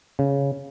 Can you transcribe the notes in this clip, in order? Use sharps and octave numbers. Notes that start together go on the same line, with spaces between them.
C#3